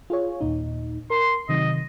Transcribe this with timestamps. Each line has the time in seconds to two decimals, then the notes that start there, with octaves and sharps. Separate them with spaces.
0.10 F4 G#4 C#5
0.41 D#2 A#2 D#4
1.10 A#4 C6
1.49 C3 D#3 F#3 D#5